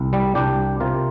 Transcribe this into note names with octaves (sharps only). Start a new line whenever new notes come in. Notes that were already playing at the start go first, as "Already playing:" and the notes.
Already playing: C2
G3
C2 D4 G4
C3 F4 A#4